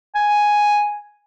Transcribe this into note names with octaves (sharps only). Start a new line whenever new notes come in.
G#5